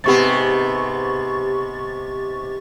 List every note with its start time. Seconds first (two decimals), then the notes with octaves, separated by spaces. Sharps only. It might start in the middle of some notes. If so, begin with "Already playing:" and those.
0.04 G#2 C3 B3 G4 C#6 A6